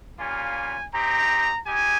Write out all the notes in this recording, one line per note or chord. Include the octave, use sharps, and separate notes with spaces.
G3 A#3 C#4 F4 G#5
C4 D#4 G4 A#5
G#3 D#4 G4 G#5